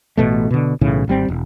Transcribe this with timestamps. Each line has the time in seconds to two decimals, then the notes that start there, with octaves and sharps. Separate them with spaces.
0.17 A1 B2 A3
0.51 B2 D3
0.81 B1 A2 C#3 E3
1.08 G#1 G3 C4
1.28 E1